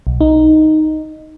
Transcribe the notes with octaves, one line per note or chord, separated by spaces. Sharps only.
B1
D#4